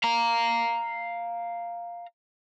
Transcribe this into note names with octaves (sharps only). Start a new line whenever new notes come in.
F5 A#5